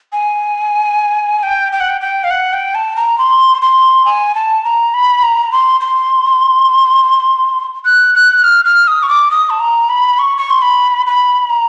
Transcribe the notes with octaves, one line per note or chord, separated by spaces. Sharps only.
G#5
G5
G5
F#5
G5
G5
F5
F#5
G5
A5
A#5
C6
C6
G#5
A5
A#5
B5
A#5
C6
C6
F#6
F#6
F6
F6
D#6
C#6
D6
D#6
A5
A#5
B5
C#6
C#6
C6
B5
B5
A#5